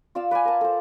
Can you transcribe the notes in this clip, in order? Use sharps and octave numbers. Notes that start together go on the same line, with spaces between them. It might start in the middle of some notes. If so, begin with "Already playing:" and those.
F4 D5 F5 E6
B4 D5 F5 G#5
A#4 A5
A4 C5